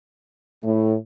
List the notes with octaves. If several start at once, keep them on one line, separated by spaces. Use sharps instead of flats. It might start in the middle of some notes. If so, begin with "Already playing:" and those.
A2